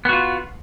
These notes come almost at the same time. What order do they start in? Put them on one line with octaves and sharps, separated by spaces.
B3 F#4 F4